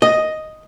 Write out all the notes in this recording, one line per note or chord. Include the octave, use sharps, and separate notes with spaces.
D#5